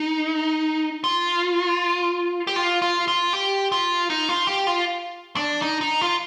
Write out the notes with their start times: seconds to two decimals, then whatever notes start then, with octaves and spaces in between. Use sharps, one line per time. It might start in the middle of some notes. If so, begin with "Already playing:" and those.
Already playing: D#4
1.04 F4
2.47 G4
2.56 F4
2.82 F4
3.08 F4
3.33 G4
3.72 F4
4.10 D#4
4.29 F4
4.47 G4
4.67 F4
5.36 D4
5.62 D#4
5.81 D#4
6.01 F4